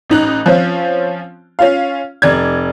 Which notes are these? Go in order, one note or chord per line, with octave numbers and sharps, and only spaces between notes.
A1 D#4 F#6
F3 C4 C#4 F4
C#4 F4 F5
F1 D5 G#6